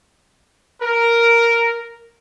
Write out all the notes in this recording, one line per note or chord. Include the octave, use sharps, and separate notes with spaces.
A#4